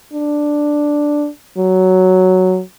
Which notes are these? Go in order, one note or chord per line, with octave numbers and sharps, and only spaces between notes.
D4
F#3